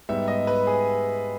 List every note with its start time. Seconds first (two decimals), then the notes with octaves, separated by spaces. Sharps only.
0.09 G#2 G3 B3 E5
0.28 D#5
0.47 B4
0.67 G#4